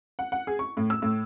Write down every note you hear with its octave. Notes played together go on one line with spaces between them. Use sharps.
F#5
F#5
G#4
C#6
A2
E6
A2